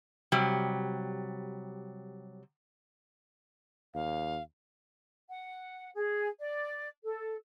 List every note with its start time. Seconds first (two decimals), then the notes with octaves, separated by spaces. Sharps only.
0.32 C3 F#3 G3
3.94 D#2 F5
5.29 F#5
5.96 G#4
6.40 D5
7.03 A4